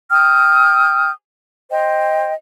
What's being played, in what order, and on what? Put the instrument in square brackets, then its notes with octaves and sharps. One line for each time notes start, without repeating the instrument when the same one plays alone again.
[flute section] G5 D#6 F6 G6
C5 D#5 G5